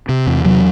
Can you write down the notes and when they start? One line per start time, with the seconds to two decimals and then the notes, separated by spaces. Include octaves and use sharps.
0.09 C3
0.26 E2
0.44 C3 F#3